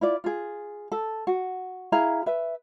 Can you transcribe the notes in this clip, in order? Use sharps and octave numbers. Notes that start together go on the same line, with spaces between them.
E4 F4 D5
F4 G#4
A4
F#4
E4 G#4 F5 A#5
B4 E5